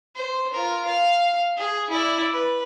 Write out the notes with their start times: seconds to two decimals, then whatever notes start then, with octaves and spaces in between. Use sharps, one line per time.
0.15 C5
0.54 F4 A#4
0.86 F5
1.57 G#4
1.90 E4 D5
2.32 B4